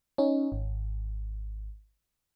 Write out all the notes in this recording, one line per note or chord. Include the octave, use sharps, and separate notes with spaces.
C#4 D#4
G#1